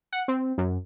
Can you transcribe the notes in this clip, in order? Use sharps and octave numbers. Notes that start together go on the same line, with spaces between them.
F#5
C4
F#2